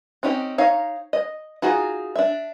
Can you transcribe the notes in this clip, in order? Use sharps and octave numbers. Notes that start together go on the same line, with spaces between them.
C4 C#4 D#4 G4
D#4 C#5 F5
D#5
D#4 F4 F#4 G#4
D4 E5